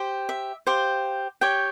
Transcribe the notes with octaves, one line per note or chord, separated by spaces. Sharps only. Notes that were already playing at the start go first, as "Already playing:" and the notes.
Already playing: G4 C5
E5
G4 C5 F5
G4 C#5 G5